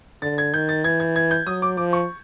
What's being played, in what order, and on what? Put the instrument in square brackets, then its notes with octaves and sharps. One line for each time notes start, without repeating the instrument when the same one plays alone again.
[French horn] D3 [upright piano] A6
[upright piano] G#6
[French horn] D#3 [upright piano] G6
[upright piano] A6
[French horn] E3 [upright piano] G#6
[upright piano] G#6
G#6
G6
[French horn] F#3 [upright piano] D#6
[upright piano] D6
[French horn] F3 [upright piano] D6
[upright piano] C#6